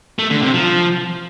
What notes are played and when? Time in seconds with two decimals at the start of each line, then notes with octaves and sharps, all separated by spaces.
0.19 A3
0.30 D3
0.42 C3
0.54 F3